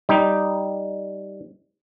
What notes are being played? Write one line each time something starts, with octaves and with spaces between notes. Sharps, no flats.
G3 D#4